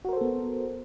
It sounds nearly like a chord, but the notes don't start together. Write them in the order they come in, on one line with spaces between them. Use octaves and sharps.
F#4 A#4 C5 A4 B3